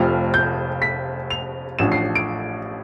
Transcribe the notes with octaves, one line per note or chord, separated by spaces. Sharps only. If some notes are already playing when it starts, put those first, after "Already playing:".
Already playing: F1 F2 C3 F3 A3 F6
G6
B6
F7
A1 A2 F3 A3 D4 E7
C7
D7